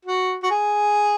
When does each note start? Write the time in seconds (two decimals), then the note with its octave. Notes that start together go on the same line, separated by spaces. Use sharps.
0.05 F#4
0.43 F#4
0.50 G#4